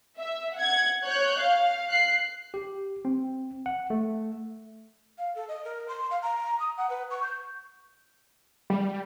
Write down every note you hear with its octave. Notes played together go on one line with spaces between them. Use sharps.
E5
F#5 G#6
C#5 F#6 G6
F5
F#6 C7
G4
C4
F#5
A3
F5
A4
D#5
A#4
C6
F5
A#5
D#6
F#5
B4
C#6
G6
G3